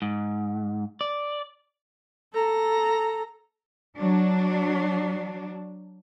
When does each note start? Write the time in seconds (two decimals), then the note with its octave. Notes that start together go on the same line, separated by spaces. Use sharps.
0.02 G#2
1.01 D5
2.33 A4 A#5
3.97 F#3 D4